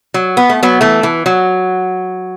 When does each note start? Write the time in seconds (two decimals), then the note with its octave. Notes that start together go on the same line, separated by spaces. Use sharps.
0.14 F#3
0.37 B3
0.49 A3
0.63 F#3 B3
0.81 E3 A3
1.03 E3
1.26 F#3